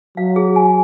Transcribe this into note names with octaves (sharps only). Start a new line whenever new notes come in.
F#3 F5
G#4
G#5